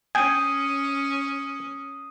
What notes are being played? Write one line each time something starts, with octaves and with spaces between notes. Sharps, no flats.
C#4 G5 G#5 D#6 C7 D#7